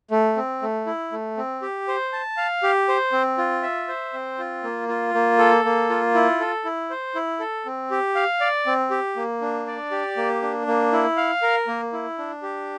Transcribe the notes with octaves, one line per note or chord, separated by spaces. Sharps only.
A3
C4
A3
E4
A3
C4
G4
C5
A5
F5
G4
C5
C4
F4
E5
C5
C4
F4
A#3
F4
A#3
A4
A#3
F4
E4
A4
E4
C5
E4
A4
C4
G4
F5
D5
C4
G4
A#3
D4
D5
G4
A#3
D4
A#3
E4
F5
A#4
A#3
E4
D4
G4